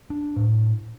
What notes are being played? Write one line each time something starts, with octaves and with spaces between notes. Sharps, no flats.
D4
A2